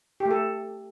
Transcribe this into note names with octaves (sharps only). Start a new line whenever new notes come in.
G4
A3
A4